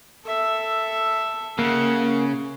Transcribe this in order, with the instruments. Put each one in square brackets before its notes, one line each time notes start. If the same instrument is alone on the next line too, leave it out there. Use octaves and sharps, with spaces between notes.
[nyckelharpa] A4 E5
[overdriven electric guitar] C#3 [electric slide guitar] A#3 [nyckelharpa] F#5